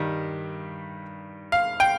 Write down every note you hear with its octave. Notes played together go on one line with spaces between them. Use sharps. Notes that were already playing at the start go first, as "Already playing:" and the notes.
Already playing: G2 D#3 G3
F5
G5